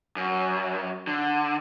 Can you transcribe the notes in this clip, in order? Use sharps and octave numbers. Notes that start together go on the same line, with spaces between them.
F#2
D3